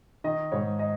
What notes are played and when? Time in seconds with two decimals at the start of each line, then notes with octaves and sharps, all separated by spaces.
0.24 D#3 D#5
0.52 G#2 C#5
0.79 D#5